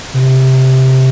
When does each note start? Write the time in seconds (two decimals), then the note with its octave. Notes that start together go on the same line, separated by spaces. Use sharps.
0.14 C3